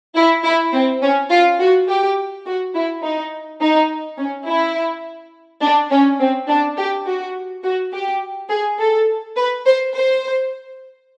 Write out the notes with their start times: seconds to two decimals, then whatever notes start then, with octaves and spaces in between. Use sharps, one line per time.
0.15 E4
0.44 E4
0.73 C4
1.02 C#4
1.30 F4
1.59 F#4
1.88 G4
2.45 F#4
2.74 E4
3.02 D#4
3.61 D#4
4.18 C#4
4.46 E4
5.61 D4
5.91 C#4
6.19 C4
6.49 D4
6.77 G4
7.06 F#4
7.63 F#4
7.93 G4
8.49 G#4
8.79 A4
9.37 B4
9.65 C5
9.94 C5